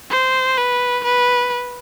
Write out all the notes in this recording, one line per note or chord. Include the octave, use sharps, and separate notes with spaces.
C5
B4
B4